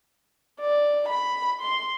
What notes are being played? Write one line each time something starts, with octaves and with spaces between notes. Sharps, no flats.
D5
B5
C6